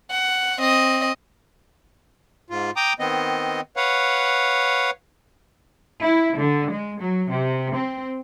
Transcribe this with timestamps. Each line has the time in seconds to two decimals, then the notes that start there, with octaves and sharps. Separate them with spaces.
0.10 F#5
0.59 C4 D#5
2.50 G#2 F4
2.76 G5 A#5 D6 D#6
2.99 D#3 B3 C4 D#5
3.77 B4 C#5 F5 F#5
6.02 E4
6.37 D3
6.72 G#3
7.02 F#3
7.31 C3
7.74 C4